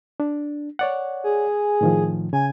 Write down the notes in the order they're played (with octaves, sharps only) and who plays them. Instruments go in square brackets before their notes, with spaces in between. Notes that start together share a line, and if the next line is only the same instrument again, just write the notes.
[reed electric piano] D4
C#5 D5 F#5
[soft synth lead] G#4
[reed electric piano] A2 D#3 F3
[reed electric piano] C#3 [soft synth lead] G#5